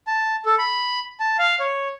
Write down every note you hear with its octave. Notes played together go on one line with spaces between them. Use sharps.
A5
A4
B5
A5
F5
C#5